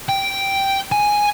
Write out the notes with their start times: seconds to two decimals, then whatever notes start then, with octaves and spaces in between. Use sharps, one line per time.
0.09 G5
0.92 G#5